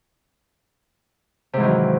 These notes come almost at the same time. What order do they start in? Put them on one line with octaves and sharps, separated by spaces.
C3 G#2 E3 D#3 F#3